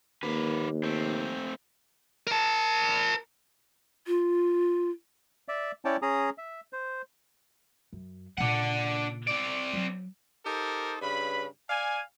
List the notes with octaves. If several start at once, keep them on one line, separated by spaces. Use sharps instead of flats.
D#2 A#3 B4
A3 C4
A#4 A5
F4
D5 E5
C#4 E4 C#5 D5 G5 A5
C#4 G#4 A#5 D#6
E5
C5
F#2
A#2 C#3 D4 F#5
C4 D5
F#3
D#4 G4 A4 A#4 C5
G2 C#3 B4 B5
D5 F5 G#5